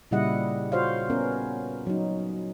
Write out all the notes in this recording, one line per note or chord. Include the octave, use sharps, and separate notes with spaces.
A#2 C#3 G3 E4 D#5 F#5
F4 F#4 C5 C#5 F5
B3 C#4 A#4
F#3 D#4